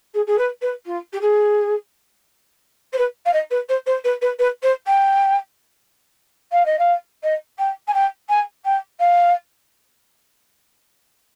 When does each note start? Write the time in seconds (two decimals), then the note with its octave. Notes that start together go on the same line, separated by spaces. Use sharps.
0.14 G#4
0.27 G#4
0.38 B4
0.61 B4
0.85 F4
1.13 G4
1.21 G#4
2.93 C5
2.98 B4
3.25 F5
3.33 D#5
3.50 B4
3.69 C5
3.86 C5
4.04 B4
4.21 B4
4.39 B4
4.62 C5
4.86 G5
6.52 F5
6.65 D#5
6.78 F5
7.23 D#5
7.58 G5
7.87 G#5
7.93 G5
8.29 G#5
8.64 G5
8.99 F5